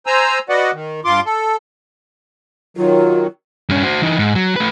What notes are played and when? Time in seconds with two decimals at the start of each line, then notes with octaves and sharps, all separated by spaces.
0.07 C5 G#5 A#5 E6
0.49 F#4 B4 D5 D#5 F#5
0.72 D#3
1.05 G2 F4 C6 D6
1.25 A4
2.77 D#3 F#3 F4
3.69 G2 C#4
3.83 F#4 C5
4.02 E3 D#4
4.19 G#2
4.35 F#3
4.56 A3 B4